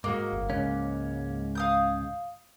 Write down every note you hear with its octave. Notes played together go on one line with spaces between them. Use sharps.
G#2 G#3 A#3 F#4
G1
C#2 G#2 C#3 C#4
F5 D#6 G6